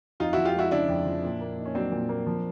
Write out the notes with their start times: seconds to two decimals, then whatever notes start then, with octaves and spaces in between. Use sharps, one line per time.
0.20 F2 D#4 F4
0.33 F3 E4 F#4
0.45 F4 G4
0.54 G#3 E4 F#4
0.71 C#3 D4 E4
0.89 F2
1.06 F3
1.23 A#2
1.41 A#3
1.58 D#4
1.65 C#4
1.75 F#3 C4 D4
1.92 A#2
2.09 A#3
2.26 F3